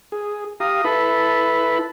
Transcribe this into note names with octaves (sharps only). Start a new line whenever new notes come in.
G#4
G4 F5 A#5 D#6
E4 A4 B4 B5